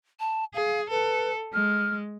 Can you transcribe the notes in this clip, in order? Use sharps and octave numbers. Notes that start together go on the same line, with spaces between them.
A5
G#4 F5
A4 B4
G#3 F6